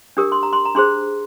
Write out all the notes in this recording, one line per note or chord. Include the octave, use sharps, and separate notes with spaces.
D4 G4 A#4 D#6
C6
A#5
C6
A#5
D4 G#4 C5 C6